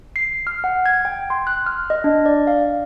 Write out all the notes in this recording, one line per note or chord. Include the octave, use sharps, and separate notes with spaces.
C7
F6
F#5
G#6
G5
C6
F#6
F6
D#5
D4
D5
F5